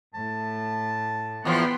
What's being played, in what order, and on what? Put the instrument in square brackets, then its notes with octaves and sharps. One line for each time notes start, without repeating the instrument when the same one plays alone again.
[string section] A2 [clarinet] A5
[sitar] E2 F3 [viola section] B3 C6 [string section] F#5 G5 B5